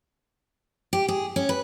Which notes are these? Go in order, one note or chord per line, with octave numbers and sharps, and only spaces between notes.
G4
G#4
C#4
B4